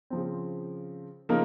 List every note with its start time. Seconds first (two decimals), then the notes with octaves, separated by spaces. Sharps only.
0.10 C#3 F3 C4
1.29 C#3 F3 A#3 D#4 A#4